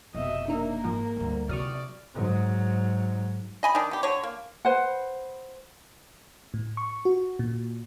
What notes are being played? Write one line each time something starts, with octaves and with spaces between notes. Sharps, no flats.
F1 B2 D#5 E5
A#3 D4 D#4 A#4 E5
G#2 F3
D2 G2
C3 F#3 D5 C#6 D#6 F6
G#2 F#3
D#5 G#5 B5
D#3 D4
B3 G4
D3 C#5
A#3
B4 C5 F#5
A2
C#6
F#4
A#2